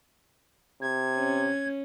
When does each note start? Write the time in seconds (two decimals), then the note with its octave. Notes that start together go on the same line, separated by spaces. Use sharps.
0.82 C3 G#6
1.16 C#4